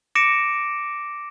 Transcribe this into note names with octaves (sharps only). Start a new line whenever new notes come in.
D6 A#6 C#7 D7 E7